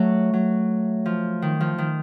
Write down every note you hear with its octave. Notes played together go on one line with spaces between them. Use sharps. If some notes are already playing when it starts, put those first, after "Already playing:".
Already playing: F#3 A3
F#3
F3
D#3
F3
D#3